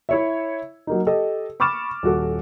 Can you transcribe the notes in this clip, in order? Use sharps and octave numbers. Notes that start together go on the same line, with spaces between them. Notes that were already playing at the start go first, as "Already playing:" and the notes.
E4 C#5 E5
F#3 A#3 D#4
G4 A4 D#5
B5 C#6 D6 F6 A6 E7
D#1 F#4 A4